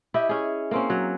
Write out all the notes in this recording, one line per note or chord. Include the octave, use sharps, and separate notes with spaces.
E4 G4 D#5
C#4 G#4
A#3 C4 C#4
F#3